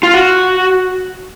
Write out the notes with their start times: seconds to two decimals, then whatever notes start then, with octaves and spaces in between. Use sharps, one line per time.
0.03 F4
0.14 F#4